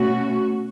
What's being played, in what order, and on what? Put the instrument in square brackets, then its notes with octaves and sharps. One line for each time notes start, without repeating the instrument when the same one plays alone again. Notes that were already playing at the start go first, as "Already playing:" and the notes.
Already playing: [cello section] B2 A3 C#4 F#4